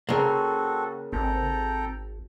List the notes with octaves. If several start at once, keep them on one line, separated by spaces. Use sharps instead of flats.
C#3 A#3 C4 F#4 A4
G#1 C4 A4 G5 A#5